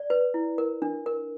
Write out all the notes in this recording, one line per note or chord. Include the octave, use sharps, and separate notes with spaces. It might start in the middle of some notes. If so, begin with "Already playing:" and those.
Already playing: D5
B4
E4
A#4
D4
A#4